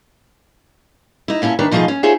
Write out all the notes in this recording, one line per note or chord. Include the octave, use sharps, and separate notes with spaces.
D#4 E4
A#2 C#4 E4 A4
D#3 D4 B4 C#5
B2 F3 A3 D#4 F4 G#4
C#4
D#4 F4 G#4 C5 C#5 E5